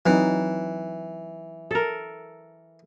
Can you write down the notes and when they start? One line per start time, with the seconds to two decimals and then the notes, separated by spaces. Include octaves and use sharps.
0.06 E3 F#3 C4 D#4
1.71 A4 A#4